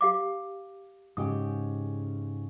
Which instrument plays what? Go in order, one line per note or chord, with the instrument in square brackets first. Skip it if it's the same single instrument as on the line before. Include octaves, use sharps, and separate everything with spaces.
[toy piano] G4 F5 D6
[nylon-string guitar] G#2 C#3 G4 [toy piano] D#6